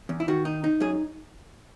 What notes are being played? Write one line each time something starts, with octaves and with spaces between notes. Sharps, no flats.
E2
E4
D#3 F#4
D#4
D#4
F#2 G#4